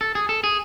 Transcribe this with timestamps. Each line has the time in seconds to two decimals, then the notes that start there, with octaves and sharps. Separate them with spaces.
0.01 A4
0.15 G#4
0.29 A4
0.44 G#4